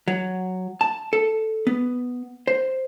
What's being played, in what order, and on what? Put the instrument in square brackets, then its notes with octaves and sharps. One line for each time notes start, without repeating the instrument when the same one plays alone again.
[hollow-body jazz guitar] F#3
A5
A4
B3
C5